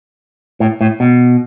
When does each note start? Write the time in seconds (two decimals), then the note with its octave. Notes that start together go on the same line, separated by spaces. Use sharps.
0.60 A2
0.81 A2
1.00 B2